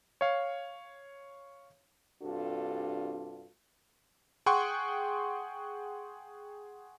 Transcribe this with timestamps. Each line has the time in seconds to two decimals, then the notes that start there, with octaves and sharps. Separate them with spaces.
0.21 C#5 F5
2.23 G2 C3 D4 F4 F#4 A4
4.46 G#4 F#5 G5 C6 C#6 F#6